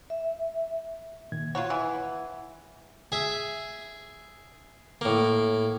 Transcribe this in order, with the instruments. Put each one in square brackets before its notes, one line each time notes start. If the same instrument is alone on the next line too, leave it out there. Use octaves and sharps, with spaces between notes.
[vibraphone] E5
[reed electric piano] A#2 D#3 G#6
[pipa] F4 F#4 C#5 [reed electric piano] F#5
[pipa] E3
[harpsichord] G#4 E5
A2 A#3